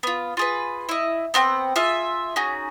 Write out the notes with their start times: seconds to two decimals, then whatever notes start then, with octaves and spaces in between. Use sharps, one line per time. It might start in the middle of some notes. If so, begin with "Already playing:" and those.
0.03 B3 F4
0.37 F4 G#4 B4
0.89 E4 D#5
1.34 B3 C4 F#5 G5
1.76 F4 G#4 E5 F6
2.36 C#4 D#4 F#4 G#4